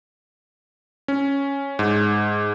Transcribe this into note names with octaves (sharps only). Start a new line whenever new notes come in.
C#4
G#2